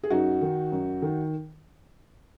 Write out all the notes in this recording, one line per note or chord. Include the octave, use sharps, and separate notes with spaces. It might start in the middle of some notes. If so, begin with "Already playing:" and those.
G#4
F#2 D#4 F#4
D#3
F#2
D#3